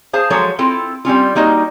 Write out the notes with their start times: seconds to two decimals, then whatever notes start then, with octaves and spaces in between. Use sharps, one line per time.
0.13 G#4 C5 F5 A5
0.30 F3 F#3 G#3 A4 C#5
0.59 C4 E4 F4 A4
1.05 G3 C4 C#4 F4
1.35 G3 A#3 D#4 F#4 D#5